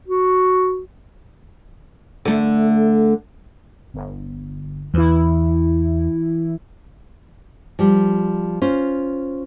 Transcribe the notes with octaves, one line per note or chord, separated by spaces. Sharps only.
F#4
D3 A3
G1
E2 E3 E4
F3 G3
C#4 F4 C5